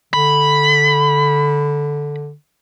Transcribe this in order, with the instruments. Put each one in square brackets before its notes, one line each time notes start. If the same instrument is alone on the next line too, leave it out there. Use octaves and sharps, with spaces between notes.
[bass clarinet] D3 [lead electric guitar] B5